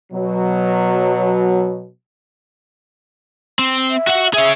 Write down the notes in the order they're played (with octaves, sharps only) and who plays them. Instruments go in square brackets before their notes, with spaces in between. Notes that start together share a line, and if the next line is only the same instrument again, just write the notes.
[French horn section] B2 F#3
[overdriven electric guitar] C4
[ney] E5
[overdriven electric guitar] F#4 F#5
[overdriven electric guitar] G#4 C#5 [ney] E5